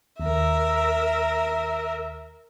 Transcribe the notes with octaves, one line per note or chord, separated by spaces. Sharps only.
D#2 A#4 E5